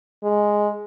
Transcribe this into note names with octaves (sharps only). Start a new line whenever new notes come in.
G#3